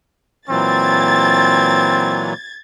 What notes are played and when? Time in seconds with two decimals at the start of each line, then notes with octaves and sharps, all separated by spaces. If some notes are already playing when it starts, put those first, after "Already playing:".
0.49 A#2 E3 F#3 C4 G#6 A6